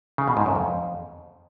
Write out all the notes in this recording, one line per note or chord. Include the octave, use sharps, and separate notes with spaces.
C#3
B2
G#2
F#2
F2